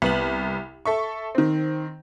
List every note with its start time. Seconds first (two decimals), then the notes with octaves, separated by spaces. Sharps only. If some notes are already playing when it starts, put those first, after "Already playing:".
0.02 C2 B3 F#7
0.85 A4 E5 C#6
1.35 D#3 C4